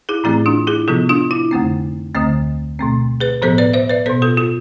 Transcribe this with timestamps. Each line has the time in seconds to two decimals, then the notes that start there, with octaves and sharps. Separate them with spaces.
0.09 E4 G#4
0.24 A2 E3 A3 C4 E4 G#4
0.46 D4 F4
0.67 E4 G#4
0.88 C3 F3 B3 F4 A4
1.09 D4 F4
1.31 E4
1.51 F2 D3 A3 C4
2.15 D2 D3 A3 C4
2.79 B2 A3 C4
3.21 G#4 B4
3.42 A2 F3 B3 A4 C5
3.58 B4 D5
3.73 C5 E5
3.89 B4 D5
4.06 B2 B3 A4 C5
4.22 F4 A4
4.37 F4 A4